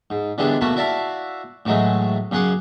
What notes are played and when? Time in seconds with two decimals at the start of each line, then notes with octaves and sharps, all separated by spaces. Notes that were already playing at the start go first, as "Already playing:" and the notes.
0.10 G#2
0.38 D3 E3 G3 G#3 B3 D4
0.61 B2 A3 A#3 F#4 A5 B5
0.76 E4 F#4 D5 E5 F5 A5
1.66 A2 E3 F#3 G#3 A3
2.31 F#2 C#3 G#4 F#5 C6 D6